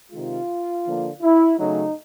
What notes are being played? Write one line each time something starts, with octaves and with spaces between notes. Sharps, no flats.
C3 D#3 G#3 F4
D3 F3 A#3
E4
C#3 F#3 A3 D#4